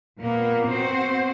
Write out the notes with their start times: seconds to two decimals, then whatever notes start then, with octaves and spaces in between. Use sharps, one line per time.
0.18 A#2 A#3 B3
0.65 B3 C4 F#4 C5